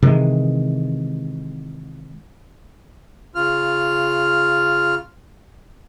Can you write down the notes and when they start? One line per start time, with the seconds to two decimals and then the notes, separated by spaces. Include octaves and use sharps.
0.03 C3 D#3 E3 G#3
3.35 C#3 F4 F6